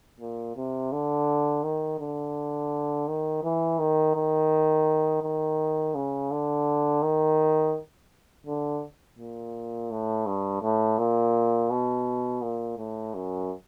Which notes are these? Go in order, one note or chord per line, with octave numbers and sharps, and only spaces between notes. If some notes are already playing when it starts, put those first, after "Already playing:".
A#2
C3
D3
D#3
D3
D#3
E3
D#3
D#3
D#3
C#3
D3
D#3
D3
A#2
A2
G2
A2
A#2
B2
A#2
A2
F#2